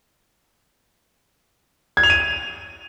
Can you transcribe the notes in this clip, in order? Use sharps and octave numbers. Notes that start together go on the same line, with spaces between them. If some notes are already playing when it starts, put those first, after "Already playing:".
G#6
F7
D#7